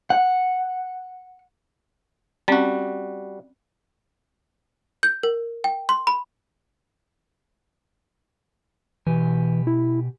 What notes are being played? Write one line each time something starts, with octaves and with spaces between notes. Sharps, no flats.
F#5
G3 C4 C#4 F#4
G6
A#4
G5
C6
B5
B2 E3 G4 G#5
E4